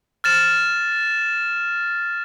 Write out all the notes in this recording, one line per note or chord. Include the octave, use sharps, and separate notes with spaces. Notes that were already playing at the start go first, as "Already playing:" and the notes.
F6 A6 E7